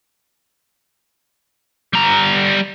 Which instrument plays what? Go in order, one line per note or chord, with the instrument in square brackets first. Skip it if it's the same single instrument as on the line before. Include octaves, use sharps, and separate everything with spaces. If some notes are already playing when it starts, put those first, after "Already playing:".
[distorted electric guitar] G3 A#5